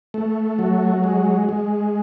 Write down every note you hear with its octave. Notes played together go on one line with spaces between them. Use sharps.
A3
F#3
G#3
G#3